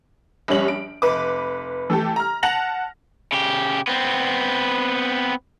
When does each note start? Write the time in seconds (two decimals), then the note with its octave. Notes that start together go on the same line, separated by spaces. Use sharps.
0.48 A#1 G2 G3 C#4 C#5 F#7
0.68 D7
1.02 F1 B4 D6
1.90 E3 A3 G4 A4
2.16 A#5 F6
2.43 F#5 A5 A#6 F7 F#7
3.32 C#3 G4
3.88 B3 C4